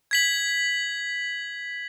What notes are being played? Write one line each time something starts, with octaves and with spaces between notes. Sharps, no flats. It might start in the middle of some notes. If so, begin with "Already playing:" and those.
G#6 B6 F#7